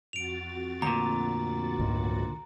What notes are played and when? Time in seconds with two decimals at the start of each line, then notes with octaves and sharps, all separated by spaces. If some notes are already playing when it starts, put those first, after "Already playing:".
0.13 F2 F#4 A6 D7 F7
0.82 D2 A#2 A#5
1.79 C#2 G#2